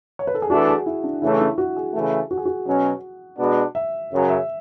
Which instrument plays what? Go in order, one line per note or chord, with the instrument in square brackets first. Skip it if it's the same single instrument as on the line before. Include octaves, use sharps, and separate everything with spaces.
[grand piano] C#5
B4
A4
G#4
[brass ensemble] E3 A3 D4 [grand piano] F#4
[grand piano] G#4
E4
D4
[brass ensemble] C#3 E3 A3 C#4 [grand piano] E4
[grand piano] E4
F#4
G#4
[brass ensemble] C#3 E3 A3
[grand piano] F#4
G#4
F#4
[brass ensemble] B2 F#3 C#4
B2 G#3 B3 D4 F#4
[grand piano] E5
[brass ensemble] F#2 C#3 F#3
[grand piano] E5